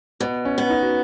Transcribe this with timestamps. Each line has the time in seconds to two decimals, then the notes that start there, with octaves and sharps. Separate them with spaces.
0.20 B2 B3
0.45 C#4
0.58 B3
0.69 D#4
0.83 F#4